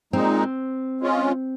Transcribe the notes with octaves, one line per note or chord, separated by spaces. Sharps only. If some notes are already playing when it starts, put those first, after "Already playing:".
A#2 G#3 C4 D#4
G#3 C#4 F4